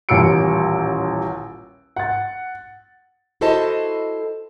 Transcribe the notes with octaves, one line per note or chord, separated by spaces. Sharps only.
D#1 A1 G3 E6 C#7 D7
F#5 A6
E4 F#4 A4 C5 D#5 A5